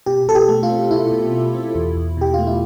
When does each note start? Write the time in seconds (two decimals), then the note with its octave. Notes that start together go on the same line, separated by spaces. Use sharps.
0.06 B2 G4
0.27 B2 A4
0.35 G4
0.49 A3
0.63 F4
0.70 C4
0.91 B2 E4
1.12 B2
1.32 A3
1.55 C4
1.75 E2
1.97 E2
2.17 B2 G4
2.34 A3 F4
2.47 E4